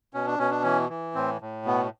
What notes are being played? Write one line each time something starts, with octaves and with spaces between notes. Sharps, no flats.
B2 C#4
D4
B2 C#4
D4
E3 C#4
E3
A2 C4
A2
B2 B3